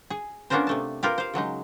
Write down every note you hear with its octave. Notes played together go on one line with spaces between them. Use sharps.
G#4
B3 C#4 D4 F4 A#4 C5
C3 A3 A5
F4 G4 A#4 B4 F5
C5 F5
C#3 F#3 G#3 D#4